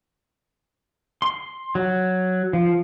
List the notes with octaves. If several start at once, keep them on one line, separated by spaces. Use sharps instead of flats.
C6
F#3
F3